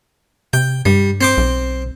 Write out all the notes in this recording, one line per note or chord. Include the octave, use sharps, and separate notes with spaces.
C3 G5
G2 G3
C4 C5 D6
B1